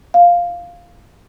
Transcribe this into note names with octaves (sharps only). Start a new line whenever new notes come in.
F5